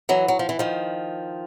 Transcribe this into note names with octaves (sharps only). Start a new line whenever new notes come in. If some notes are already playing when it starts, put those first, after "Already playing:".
E3 F#3
F#3
F3
E3
D#3 F3